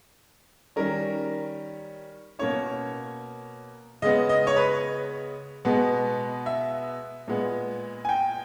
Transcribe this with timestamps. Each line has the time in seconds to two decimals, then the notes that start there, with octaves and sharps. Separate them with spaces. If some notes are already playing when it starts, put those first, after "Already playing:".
0.76 D#3 G3 C#4 A#4
2.39 B2 A#3 C#4 C#5
4.02 C#3 G#3 B3 D#5
4.29 D#5
4.47 C#5
4.56 B4
5.65 B2 G#3 B3
6.46 E5
7.28 A#2 G#3 B3
8.05 G#5
8.09 G5